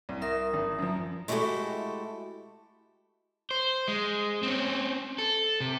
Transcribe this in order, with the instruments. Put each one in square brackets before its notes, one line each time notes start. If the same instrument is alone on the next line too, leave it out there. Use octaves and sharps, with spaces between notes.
[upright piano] C2
[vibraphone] A#4 E5 D#6
[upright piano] G#1
F#2 F3
[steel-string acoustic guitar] G#3 A3 E4 F#4 G4 A4
[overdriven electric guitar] C5
G#3
C4 C#4
A4
C3